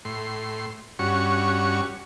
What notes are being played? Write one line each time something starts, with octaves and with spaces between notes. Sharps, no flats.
A2 C6
G2 C#4 F#4 C#6